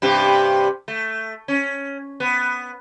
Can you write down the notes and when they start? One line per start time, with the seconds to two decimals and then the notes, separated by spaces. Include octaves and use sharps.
0.02 G2 C3 G4
0.88 A3
1.48 C#4
2.20 B3